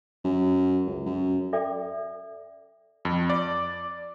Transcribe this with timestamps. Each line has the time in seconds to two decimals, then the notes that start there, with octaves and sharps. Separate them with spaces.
0.24 F#2
0.86 C#2
1.06 F#2
1.53 A4 D5 E5 G5 D6
3.05 F2
3.30 D5